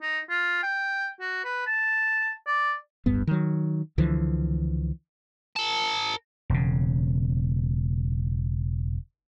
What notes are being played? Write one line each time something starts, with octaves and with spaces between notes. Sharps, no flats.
D#4
F4
G5
F#4
B4
A5
D5
D1 G1 G2 B3
D#3 F#3
C#2 D3 E3 F3
A#4 A5
E1 C#3